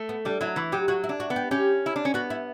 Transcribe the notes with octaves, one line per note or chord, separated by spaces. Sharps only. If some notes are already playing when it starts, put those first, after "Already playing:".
Already playing: A3
B3
G3 D4
F#3 E4
E3 F#4
F#3 G4
F#3 F#4
E4
D4
F#4
B3
G4
C#4 G4
E4
D4
C#4
B3 F#4
E4